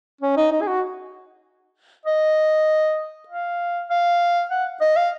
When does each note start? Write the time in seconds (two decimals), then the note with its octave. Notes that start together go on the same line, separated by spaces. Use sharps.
0.21 C#4
0.37 D#4
0.52 D#4
0.61 G#4
0.67 F#4
2.06 D#5
3.28 F5
3.90 F5
4.51 F#5
4.81 D#5
4.96 F5